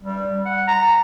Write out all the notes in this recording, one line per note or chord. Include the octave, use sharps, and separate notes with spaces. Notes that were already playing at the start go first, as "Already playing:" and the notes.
G3
F#5
A#5